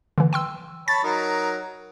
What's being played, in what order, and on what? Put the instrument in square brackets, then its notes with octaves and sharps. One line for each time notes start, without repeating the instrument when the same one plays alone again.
[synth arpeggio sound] D3 E3
G5 C6 E6
[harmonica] C#5 A5 B5 [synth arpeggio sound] A6
[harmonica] F#3 D#4 A#4